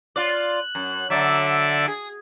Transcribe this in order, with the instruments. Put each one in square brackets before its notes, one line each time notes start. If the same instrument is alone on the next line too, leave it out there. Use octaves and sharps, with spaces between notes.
[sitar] F4 D5 [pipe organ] F#6
[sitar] F#2
[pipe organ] D3 D5 E5 [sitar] F#3
[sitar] G#4